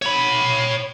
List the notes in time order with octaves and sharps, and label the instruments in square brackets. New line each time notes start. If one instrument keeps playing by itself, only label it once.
[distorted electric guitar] C#5 B5